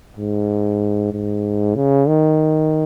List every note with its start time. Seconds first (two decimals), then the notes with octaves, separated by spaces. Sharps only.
0.17 G#2
1.13 G#2
1.76 C#3
2.08 D#3